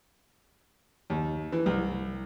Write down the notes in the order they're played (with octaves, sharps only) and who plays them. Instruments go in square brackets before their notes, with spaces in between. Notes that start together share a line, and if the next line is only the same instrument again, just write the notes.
[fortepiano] D#2
E3
C2